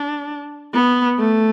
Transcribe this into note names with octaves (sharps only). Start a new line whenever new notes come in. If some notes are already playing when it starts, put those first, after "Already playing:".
Already playing: D4
B3
A3